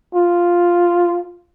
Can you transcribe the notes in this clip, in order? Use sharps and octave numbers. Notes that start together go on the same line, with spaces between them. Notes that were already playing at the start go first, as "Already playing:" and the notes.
F4